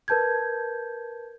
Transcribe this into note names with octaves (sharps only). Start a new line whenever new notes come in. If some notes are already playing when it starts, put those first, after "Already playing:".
A#4 B4 A5 G6 G#6